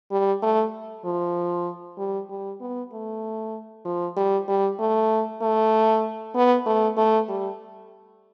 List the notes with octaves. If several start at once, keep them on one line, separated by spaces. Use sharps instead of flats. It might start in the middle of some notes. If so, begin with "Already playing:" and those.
G3
A3
F3
G3
G3
B3
A3
F3
G3
G3
A3
A3
B3
A3
A3
G3